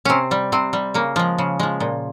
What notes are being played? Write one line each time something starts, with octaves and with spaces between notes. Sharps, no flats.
C3 C4 C#4
G3
C3 C4
G3
C#3 A#3
F3 G#3
C#3
F3 G#3
A#2